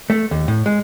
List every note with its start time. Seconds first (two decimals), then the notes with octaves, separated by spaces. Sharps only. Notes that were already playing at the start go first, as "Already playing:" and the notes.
0.10 A3
0.31 D#2
0.48 A2
0.66 G#3